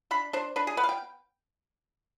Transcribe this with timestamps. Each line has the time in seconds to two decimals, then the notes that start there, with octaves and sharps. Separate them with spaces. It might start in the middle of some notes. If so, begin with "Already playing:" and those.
0.11 D4 B5
0.33 D4 C5
0.56 D4 B4
0.67 G#4
0.77 B3 B4
0.84 F5
0.89 G5